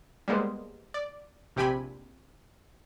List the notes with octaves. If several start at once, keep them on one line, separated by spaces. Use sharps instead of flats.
G3 G#3 A#3 B3 C5
D5
A#1 C3 G4 G5 G#5 B5